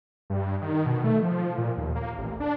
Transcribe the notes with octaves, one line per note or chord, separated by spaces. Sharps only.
G2
D#3
B2
A3
F3
A#2
D#2
A#3
A1
D4